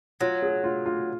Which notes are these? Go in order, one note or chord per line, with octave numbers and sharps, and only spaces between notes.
F#3 F4
G#4
F4
F4